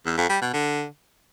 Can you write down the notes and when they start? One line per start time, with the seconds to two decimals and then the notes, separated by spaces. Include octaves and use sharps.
0.06 E2
0.17 F2
0.29 G3
0.41 B2
0.53 D3